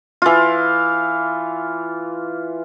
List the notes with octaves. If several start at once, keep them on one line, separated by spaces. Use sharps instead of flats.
E3 F4